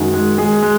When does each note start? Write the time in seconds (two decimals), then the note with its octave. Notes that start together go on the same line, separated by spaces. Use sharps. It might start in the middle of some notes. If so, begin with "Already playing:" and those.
Already playing: F#2 D#3 G#3 F#4
0.14 G#3
0.38 G#3 G#4
0.63 G#3